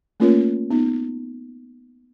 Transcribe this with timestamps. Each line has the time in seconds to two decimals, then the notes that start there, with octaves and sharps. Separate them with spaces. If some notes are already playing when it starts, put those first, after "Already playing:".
0.20 A3 A#3 C#4 F4 A#4 C#5
0.70 B3 D#4